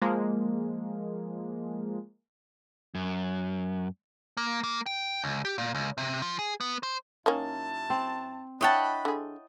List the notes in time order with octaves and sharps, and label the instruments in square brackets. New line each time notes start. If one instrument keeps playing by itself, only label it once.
[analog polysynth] F3 G#3 A#3
[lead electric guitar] F#2
A#3
A#3
G5
C#2
G4
A#2
C#2
C3
F3
G#4
B3
C5
[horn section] F#2 E4 A5 [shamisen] D#3 A#3 C#4
[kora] C4
[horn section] D4 B5 [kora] E4 C#5 F#5 [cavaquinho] D#5 G5 A5
[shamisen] D3 G#4